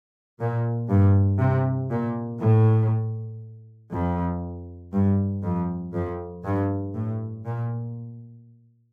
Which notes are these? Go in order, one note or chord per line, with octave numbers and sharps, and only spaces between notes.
A#2
G2
C3
A#2
A2
F2
G2
F2
F2
G2
A2
A#2